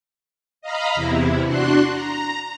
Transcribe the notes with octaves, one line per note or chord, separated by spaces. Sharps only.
D#5 F5 A#5 B5
E2 C3 E4
D4 F#4 C6 F#6
A#5